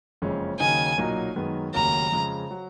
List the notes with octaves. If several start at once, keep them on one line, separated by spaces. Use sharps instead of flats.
F#1 F2 C#3 G#3 C#4
D#2 C#3 F#3 A#3 D#4 G#5
B1 A#2 F#3 A#3 D#4
F#2 D#3 G#3 B3
F1 D#2 C#3 F#3 A#3 A#5
F2 C#3 G#3
F#3